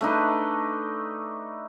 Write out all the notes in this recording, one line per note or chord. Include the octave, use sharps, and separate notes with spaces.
A3 D4 D#4 B4